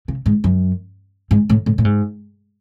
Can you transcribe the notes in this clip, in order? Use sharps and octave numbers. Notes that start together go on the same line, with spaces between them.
C#3
G#2
F#2
G#2
A2
A2
A2
G#2